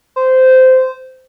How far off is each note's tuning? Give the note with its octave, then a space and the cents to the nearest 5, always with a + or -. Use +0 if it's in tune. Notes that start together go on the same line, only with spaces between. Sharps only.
C5 -15